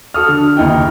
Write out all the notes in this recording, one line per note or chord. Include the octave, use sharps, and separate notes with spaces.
F#4 A4 D#6 F6
D3
F#1 D#2 D#4 E4 G5